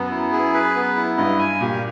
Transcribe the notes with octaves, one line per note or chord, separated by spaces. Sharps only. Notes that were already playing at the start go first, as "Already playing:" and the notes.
Already playing: F#2 B3
E4
G#4
B4
B3
E4
G2 D#5
G#5
A#2 G4